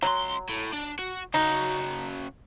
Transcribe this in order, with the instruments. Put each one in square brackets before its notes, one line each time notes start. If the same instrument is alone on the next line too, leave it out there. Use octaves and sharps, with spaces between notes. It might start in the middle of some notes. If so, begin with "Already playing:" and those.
[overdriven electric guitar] C#2 C6 [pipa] F#3
[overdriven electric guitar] A2
D4
F#4
[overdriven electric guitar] C#3 F#4 [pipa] D#4